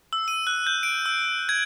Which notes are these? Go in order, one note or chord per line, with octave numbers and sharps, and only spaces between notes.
E6
D#7
F#6
G6
D7
E6
G#6